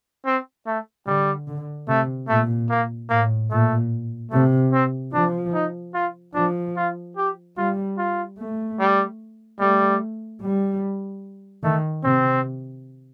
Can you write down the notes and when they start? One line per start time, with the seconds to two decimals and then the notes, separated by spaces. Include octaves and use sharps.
0.25 C4
0.67 A3
1.07 D3 G3
1.48 D3
1.88 C3 A3
2.29 A#2 A3
2.70 A#3
3.10 A2 A#3
3.51 A#2 A3
4.31 C3 A3
4.73 C4
5.14 F3 D4
5.54 D#4
5.94 F4
6.35 F3 D4
6.76 F4
7.17 G4
7.57 G3 F4
7.98 F4
8.38 A3
8.80 G3
9.60 G3 A3
10.41 G3
11.63 D#3 A3
12.04 C3 C4